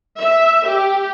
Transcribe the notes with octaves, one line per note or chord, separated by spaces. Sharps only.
E5
G4